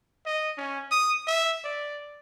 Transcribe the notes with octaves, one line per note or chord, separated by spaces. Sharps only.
D#5
C#4
D#6
E5
D5